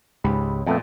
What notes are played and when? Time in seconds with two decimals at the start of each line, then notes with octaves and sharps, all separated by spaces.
0.24 C#2 G#2 G4 B5
0.66 F2 A#2 A3 B3